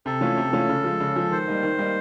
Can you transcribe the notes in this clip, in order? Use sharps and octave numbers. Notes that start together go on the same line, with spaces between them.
C3 A4
E3 A3 C#4 F4
C3
E3 A3 C#4 F4
C#3
F3 G#3
C#3
F3 G#3
D#3 C5
G3 A#3 D#4
D#3
G3 A#3 D#4